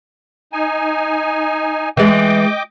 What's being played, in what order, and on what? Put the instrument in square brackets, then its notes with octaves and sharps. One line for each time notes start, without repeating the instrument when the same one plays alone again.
[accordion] D#4 G#5
[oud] E3 G#3 [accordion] D#5 G5 D6